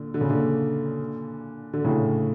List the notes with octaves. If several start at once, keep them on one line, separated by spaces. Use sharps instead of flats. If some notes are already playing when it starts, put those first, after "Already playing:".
Already playing: A#2 D3
D3
C#3
A#2 D3
D3
A2 C#3